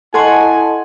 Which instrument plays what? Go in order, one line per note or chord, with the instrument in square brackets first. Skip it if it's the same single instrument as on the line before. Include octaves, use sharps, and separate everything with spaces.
[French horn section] E4 D#5 [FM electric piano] A4 A5 [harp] F#5 C6 C#6 [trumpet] G#5